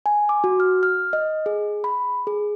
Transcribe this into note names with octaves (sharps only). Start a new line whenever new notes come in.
G#5
D6
F#4
F6
F6
D#5
G#4
B5
G#4